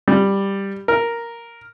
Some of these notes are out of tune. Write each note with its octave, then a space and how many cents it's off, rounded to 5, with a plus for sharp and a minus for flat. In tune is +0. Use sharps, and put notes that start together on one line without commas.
G3 +5
A#4 +0